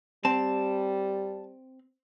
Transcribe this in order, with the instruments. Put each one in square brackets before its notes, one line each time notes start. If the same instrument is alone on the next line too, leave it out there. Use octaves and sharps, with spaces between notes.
[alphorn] G3 [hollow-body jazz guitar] C4 [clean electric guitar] A5